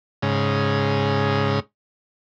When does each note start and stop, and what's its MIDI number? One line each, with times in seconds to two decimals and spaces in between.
0.22 1.60 44
0.22 1.60 49